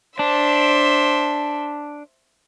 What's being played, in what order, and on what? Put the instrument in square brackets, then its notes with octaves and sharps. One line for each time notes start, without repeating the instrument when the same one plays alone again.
[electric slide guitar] D4 [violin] C5 E5